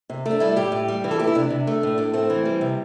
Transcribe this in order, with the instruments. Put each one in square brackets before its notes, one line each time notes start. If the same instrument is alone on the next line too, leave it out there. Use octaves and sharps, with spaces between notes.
[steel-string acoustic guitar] C3
A3
D4
G3 E4
A2 G4
A2
G3
E3
A4
A3 G4
E4
C3 D4
C3
A3
A2
A2 D4
A3 C4
E3
G3
C3